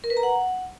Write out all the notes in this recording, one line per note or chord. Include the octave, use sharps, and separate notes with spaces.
A#4
B4
A#5
F#5